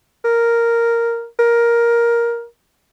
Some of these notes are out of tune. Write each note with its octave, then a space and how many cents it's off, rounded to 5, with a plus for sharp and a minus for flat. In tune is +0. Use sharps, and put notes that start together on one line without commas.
A#4 -5
A#4 +10